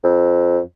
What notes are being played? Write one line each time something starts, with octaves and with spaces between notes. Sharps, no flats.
F2